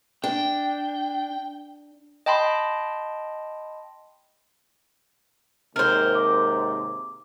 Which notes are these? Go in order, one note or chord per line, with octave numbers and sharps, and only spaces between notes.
D4 G5
D#5 G5 A5 B5 C6
D#2 G#2 C3 A#4 C5 F6
D6